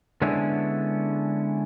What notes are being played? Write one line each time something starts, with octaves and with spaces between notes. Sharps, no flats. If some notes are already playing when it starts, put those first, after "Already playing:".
D3 G#3 B3 C#4 D4 E4